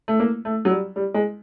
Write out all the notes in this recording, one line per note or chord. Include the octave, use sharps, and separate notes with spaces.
A3
A#3
A3
F#3
G3
G3
G#3